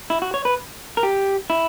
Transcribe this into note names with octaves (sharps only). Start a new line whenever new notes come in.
E4
F#4
C#5
B4
A#4
G4
E4